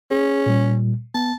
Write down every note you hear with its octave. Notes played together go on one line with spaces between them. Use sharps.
C#4 G#4
A#2 G3
B3 A5